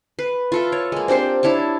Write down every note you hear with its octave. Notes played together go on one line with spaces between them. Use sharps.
B4
F4 A4 E5
C#5
G#3 A#3
C4 D4 G4 C5
D4 E4 C#5 A5